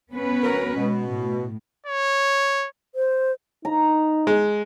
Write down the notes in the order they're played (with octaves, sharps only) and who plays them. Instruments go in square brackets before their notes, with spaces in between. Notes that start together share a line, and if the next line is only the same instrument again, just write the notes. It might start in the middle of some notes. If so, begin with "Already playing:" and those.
[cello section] B3 C#4 B4
[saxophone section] D2 F#3 A#4
[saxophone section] B2 [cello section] G#3
[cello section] A2
[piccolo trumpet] C#5
[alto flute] C5
[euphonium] D#4 [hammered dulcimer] A#5
[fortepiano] G#3